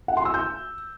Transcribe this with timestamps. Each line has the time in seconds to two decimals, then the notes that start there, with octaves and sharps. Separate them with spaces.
0.08 F#5
0.17 C6
0.25 E6
0.34 G6